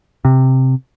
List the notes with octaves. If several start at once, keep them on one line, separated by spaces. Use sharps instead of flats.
C3